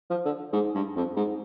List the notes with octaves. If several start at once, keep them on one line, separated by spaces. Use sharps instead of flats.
F3
D3
G#2
G2
F2
G#2